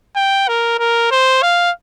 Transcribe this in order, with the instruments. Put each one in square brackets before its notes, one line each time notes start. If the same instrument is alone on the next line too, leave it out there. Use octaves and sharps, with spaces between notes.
[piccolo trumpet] G5
A#4
A#4
C5
F5